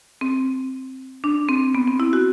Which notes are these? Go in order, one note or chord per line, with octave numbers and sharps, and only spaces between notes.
C4
D4
C4
B3
C4
E4
F#4